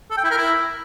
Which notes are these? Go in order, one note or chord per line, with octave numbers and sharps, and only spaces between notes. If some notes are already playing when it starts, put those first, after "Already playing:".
A4
G5
E4
A#4
E4